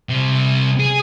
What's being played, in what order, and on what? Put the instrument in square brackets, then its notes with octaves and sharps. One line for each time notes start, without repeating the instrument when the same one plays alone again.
[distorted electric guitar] C2 C3
G#4